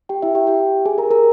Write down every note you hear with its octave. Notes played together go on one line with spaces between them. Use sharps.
G4 G5
E4 E5
G4 G5
G4 G5
G#4 G#5
A#4 A#5
A#4 A#5